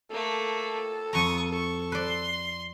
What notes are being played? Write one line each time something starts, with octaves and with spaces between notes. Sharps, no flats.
A3 A#3 A4
F2 A#5 C#6 D#6
A4 C#6
B4 D5 C6